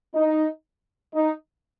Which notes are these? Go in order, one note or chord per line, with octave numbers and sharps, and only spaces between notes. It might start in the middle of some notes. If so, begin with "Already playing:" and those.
D#4
D#4